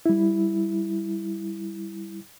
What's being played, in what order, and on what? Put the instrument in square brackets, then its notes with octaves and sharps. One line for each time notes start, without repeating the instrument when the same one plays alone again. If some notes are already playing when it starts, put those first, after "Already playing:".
[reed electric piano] G3 E4